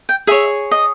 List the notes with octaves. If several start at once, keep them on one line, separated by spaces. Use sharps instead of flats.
G5
G#4 C#5 E5
D#5